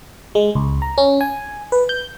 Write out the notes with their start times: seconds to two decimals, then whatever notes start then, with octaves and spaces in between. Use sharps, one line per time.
0.35 G#3
0.55 C#2
0.82 A#5
0.98 C#4
1.21 G#5
1.72 B4
1.89 G6